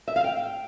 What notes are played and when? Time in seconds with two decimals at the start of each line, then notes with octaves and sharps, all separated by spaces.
0.08 E5
0.16 F5
0.24 G5